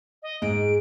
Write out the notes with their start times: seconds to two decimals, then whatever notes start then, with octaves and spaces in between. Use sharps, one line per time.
0.22 D#5
0.42 G#2 G#3 G#4 D7